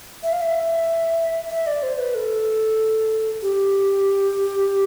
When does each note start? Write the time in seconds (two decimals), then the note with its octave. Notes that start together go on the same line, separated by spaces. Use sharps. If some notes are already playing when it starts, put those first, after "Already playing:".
0.23 E5
0.32 F5
0.42 E5
1.51 E5
1.67 D5
1.83 C5
1.98 B4
2.15 A4
3.43 G4